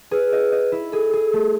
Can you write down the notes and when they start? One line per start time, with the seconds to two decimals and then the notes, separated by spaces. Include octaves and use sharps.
0.11 G#4 B4
0.32 D#5
0.52 D#5
0.72 E4
0.92 G#4 A4
1.13 G#4
1.33 A3